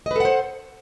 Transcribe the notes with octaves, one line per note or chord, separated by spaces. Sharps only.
A4 B4 C5 D#5 F#5